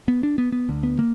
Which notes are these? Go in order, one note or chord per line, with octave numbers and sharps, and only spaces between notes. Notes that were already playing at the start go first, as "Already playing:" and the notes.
B3
D4
B3
B3
D2 D3
B3
A#3